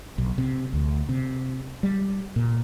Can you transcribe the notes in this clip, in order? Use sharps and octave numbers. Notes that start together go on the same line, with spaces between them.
B1
C3
D2
C3
G3
A#2